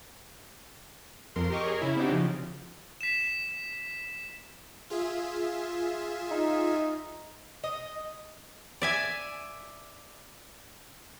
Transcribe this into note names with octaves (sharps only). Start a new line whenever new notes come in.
F2 A#4 C6
G4 A#4 D#5 C#6 D6
G#4 A#4 C#5
C#3 E4
C4 D4 D#4 F#4 G4
C#3 F3
B6 E7
F4 G#4 E5
D#4
D#5
D5 E5 G#5